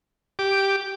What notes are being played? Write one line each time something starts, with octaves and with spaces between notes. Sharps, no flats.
G4 D6